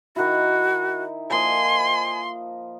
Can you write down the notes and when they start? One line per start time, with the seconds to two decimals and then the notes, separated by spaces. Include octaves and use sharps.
0.16 D#3 E4 F#4
1.30 F3 A#3 D#5 G#5 C6